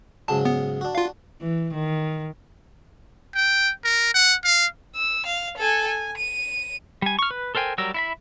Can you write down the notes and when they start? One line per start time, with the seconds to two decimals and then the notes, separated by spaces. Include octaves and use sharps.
0.28 G#2 C#3 F#3 A5
0.45 B3
0.81 D4 F#4
0.95 F4 F5
1.41 E3
1.73 D#3
3.35 G5
3.84 A#4
4.14 F#5
4.44 F5
4.96 E6
5.26 F5
5.57 A4 G#5
5.87 G#5
6.17 D#7
7.02 G3 G#5
7.19 C#6 F6
7.31 B4
7.55 A4 A#4 C5 G5 G#5
7.78 F#3 G3 A#4 E6
7.94 E4 E5 B5